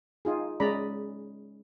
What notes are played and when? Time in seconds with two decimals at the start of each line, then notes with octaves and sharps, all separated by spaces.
0.25 D#4 F4 G#4
0.60 G#3 C#4 G#4 D5 A#5 B5